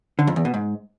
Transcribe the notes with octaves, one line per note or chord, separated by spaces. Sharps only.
D3
F2
E2
B2
G#2